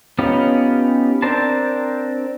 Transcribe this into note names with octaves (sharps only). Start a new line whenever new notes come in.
B3 C#4 D#4 F4 G4
C4 D4 A#4 C5 A5